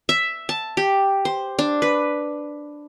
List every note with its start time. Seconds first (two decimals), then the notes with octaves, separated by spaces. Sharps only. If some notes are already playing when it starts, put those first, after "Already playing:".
0.09 E5
0.49 A5
0.77 G4
1.25 C5
1.59 D4
1.82 B4